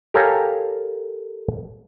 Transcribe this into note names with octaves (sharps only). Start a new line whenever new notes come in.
G4 A4 A#4 C#5 F5 G#5